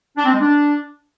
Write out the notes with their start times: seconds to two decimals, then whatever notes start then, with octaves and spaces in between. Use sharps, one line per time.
0.17 D4
0.25 C4
0.33 G#3
0.41 D4